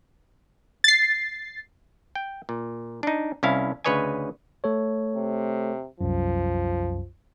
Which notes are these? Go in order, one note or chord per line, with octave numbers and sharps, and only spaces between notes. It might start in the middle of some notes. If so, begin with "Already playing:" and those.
A6 C7
G5
A#2
D4 D#4
C2 C#4 E4 F5
D2 C#3 B4 C#5 D#5 G#5
A3 A4 C#5
C3
C2 F#2 F3